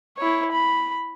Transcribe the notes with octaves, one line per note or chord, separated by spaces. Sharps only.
E4 C#5
B5